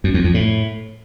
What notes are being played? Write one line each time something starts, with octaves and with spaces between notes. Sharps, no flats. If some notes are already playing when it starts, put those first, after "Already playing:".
F#2
F2
F2
A2